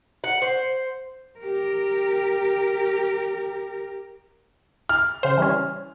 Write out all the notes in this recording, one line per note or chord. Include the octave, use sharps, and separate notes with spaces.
F#5
C5
G4 A#4
F6
C#3 C5
E3 G3 C#4